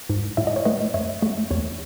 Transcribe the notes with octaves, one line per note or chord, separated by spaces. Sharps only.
G#2
A2 E5
D#5
C#5
A3 B4 D#5
F#2 C#5 E5
A3
E2 C#5